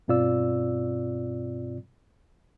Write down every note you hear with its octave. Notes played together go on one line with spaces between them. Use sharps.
G2 B2 C4 F4 D5 E6